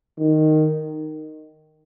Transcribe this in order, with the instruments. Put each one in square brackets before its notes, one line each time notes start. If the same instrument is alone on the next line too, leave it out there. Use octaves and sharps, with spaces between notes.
[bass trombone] D#3